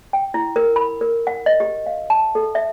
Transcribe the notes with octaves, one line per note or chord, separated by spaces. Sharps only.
G5
E4
A#4
B5
A#4
F#5
D#5
G4
F5
A5
A4
E5